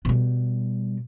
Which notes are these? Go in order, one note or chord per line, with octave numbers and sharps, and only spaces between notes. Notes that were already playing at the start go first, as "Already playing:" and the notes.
B2 G3